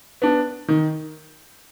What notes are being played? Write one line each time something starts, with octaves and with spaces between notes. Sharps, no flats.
B3 D4
D#3